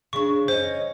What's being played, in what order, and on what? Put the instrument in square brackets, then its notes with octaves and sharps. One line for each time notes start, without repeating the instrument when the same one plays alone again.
[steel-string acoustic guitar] C#3 D4 [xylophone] C#6
[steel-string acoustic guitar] C#4 C#5 D#5 [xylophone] C5